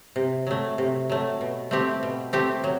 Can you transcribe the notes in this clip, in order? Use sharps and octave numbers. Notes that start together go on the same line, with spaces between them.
C3
F#3 A3
C3
F#3 A3
B2
A3 C4 G4
B2
A3 C4 G4
F#3